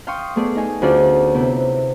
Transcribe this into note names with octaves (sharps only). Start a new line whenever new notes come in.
F5 G5 C6 C#6 D#6
A3 B3 G#4 D5
D#4 G#5
D2 C#4 F4 G#4 D5
C3 B3 E4